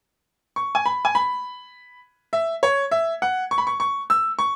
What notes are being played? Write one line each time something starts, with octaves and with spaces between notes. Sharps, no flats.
C#6
G#5
B5
G#5
B5
E5
C#5
E5
F#5
C#6
B5
C#6
C#6
E6
C#6